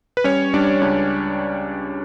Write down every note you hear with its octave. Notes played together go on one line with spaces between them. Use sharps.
B4
G3 C#4 C#5
G3 D4 D5
C#2 D4 D5